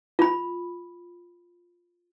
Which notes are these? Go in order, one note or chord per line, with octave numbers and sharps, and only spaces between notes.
F4 B5